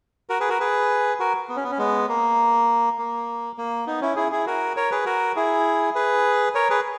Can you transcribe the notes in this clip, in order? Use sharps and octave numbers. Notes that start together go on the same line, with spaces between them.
F#4 A#4
G#4 B4
F#4 A#4
G#4 B4
F#4 A#4
B3
C#4
B3
C#4
G#3 B3
A#3
A#3
A#3
B3 D#4
C#4 E4
E4 G#4
E4 G#4
F#4 A#4
A#4 C#5
G#4 B4
F#4 A#4
E4 G#4
G#4 B4
A#4 C#5
G#4 B4